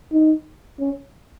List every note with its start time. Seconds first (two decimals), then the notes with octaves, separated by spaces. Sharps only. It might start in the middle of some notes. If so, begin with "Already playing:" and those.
0.12 D#4
0.80 C#4